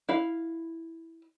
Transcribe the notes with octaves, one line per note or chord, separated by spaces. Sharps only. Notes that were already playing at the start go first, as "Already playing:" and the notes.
E4 F5